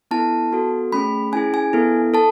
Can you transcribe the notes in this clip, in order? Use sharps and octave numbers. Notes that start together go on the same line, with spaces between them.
B3 E4 A4 A5
B3 F#4 A4
A3 C#4 G#4 B5
C#4 E4 G#4 G#5
G#5
B3 E4 A4
A4 A5